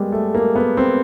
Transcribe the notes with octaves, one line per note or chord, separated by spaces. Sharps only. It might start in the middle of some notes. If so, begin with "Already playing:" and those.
Already playing: G3 G#3 A#3 B3
A3
A#3
B3
C4